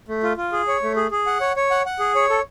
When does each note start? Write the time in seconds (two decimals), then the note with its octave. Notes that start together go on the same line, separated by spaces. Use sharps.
0.08 A3
0.23 F4
0.37 F4
0.52 G#4
0.68 C#5
0.82 A3
0.96 G#4
1.11 G#4
1.26 F#5
1.41 C#5
1.56 C#5
1.71 F#5
1.86 F#5
1.99 G#4
2.15 C#5
2.30 A4